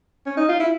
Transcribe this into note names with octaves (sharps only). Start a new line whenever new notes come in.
C#4
D#4
F4
E4